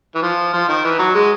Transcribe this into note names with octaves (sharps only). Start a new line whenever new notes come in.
E3
F3
F3
D#3
E3
F#3
G#3